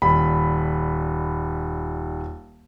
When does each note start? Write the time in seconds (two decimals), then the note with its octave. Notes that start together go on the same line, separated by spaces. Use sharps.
0.02 D#1 B5